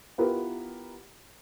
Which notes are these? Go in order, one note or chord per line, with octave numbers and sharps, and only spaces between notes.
B3 E4 F4 G4 A#4 B4